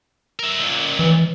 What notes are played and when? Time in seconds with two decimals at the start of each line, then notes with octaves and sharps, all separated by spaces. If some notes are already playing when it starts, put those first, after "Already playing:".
0.39 A#4 E5
0.58 C#2 A#2
0.99 E3